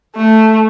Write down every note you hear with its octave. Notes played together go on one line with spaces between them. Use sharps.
A3